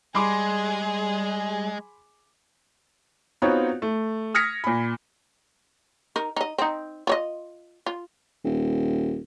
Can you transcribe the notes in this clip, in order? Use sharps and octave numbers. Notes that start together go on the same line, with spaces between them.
G3 G#3 G#4 B5 C6 D6
B3 C4 D#4 F4 F#4 C#5
A3
D#6 F6 G#6 A#6 B6 C#7
A#2 B5
D#4 A#4
D#4 D#5
C4 D#4
F4 C#5 D#5
F4
D#1